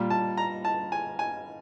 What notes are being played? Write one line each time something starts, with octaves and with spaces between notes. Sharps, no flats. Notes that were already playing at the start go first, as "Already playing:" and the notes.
Already playing: A#2 G3
A5
A#5
A5
G#5
G#5